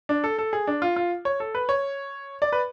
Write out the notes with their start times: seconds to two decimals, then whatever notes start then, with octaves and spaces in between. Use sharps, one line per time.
0.09 D4
0.24 A4
0.39 A4
0.53 G#4
0.67 D4
0.82 F4
0.96 F4
1.25 C#5
1.40 A4
1.55 B4
1.69 C#5
2.42 D5
2.52 B4